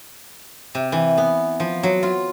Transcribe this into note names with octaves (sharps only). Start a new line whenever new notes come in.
C3
E3
B3
F3
F#3
F4